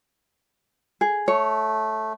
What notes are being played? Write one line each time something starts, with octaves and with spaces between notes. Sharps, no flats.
G#4
A3 C#5